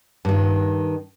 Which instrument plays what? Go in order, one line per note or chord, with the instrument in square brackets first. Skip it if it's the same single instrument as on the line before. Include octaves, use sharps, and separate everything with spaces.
[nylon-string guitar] G2 D#3